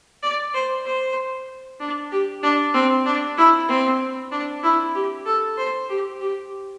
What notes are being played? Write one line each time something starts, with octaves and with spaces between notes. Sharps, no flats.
D5
C5
C5
D4
G4
D4
C4
D4
E4
C4
D4
E4
G4
A4
C5
G4
G4